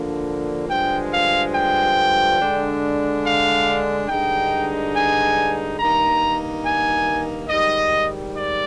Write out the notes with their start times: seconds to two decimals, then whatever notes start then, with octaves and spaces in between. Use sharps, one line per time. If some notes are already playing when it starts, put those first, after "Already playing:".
Already playing: D3 F3 A#3 D4
0.69 G2 D3 F3 G#3 G5
1.11 F5
1.54 G5
2.39 D3 G#3 D4
3.23 F5
4.08 G2 D3 G#3 D#4 G5
4.94 G#5
5.79 G2 D#3 A#3 D#4 A#5
6.64 G#5
7.49 G#2 D#3 G3 D#5
8.35 D5